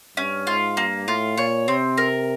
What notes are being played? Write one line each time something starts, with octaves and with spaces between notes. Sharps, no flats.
G2 C#4
G#2 F4
G2 A#3
A2 F4
A#2 C#5
C3 C4
A#4